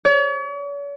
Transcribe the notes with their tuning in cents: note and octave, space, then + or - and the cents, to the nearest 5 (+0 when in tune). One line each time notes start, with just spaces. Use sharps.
C#5 +45